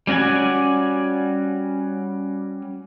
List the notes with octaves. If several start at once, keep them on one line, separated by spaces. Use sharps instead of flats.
G3 C#4 F#4 D5 G#5